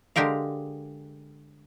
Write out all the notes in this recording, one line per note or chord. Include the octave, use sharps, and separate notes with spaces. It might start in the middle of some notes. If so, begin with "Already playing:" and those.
D3 G#3 G4 A#4 F5